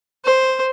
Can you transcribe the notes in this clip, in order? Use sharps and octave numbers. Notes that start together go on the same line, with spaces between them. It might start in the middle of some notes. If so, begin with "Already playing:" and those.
C5